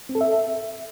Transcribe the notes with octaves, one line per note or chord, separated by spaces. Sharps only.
C4
A4
E5